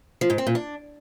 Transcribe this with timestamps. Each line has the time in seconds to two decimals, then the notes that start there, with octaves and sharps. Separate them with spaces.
0.21 F3
0.30 G#2
0.38 C4
0.47 A#2
0.55 D4